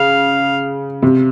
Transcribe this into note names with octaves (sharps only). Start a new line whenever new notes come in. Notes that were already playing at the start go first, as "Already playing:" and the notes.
Already playing: C#3 F5
C3